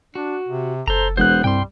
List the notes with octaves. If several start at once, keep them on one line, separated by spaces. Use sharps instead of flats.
D4 F#4
C3
F#1 A4 C5 A#5
E1 B3 C5 F#6
C2 G2 G3 G5 C6